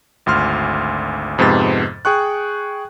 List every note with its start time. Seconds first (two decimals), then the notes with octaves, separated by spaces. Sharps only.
0.26 G#1 D2 C6 F6
1.38 F2 G#2 C3 B3 A6
2.05 G#4 G5 C#6 F#6